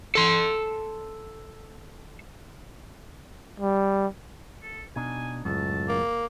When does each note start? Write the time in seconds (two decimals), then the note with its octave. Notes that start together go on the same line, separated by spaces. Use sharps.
0.15 A4 C6
3.60 G3
4.62 A4
4.96 B2 D4 D#4 G#5
5.45 C#2 F#2 A2 A5
5.88 A#3